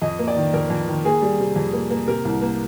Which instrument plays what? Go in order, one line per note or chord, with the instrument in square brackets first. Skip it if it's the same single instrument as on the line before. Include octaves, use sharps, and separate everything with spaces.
[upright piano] F2 D#5
A#3
D5
D#3
F2 A#4
F2
D#3
A#3 G#4
G3
C3
F2
A#3
A#3
C3 A#4
C2
A#3